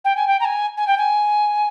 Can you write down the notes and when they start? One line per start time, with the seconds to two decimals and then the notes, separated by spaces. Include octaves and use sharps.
0.04 G5
0.16 G#5
0.27 G5
0.40 A#5
0.45 G#5
0.77 G#5
0.87 G5
0.97 G#5